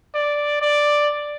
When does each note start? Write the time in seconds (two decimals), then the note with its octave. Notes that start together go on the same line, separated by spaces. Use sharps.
0.15 D5
0.62 D5